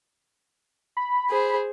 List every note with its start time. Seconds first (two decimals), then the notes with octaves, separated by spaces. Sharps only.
0.97 B5
1.30 G#4 C5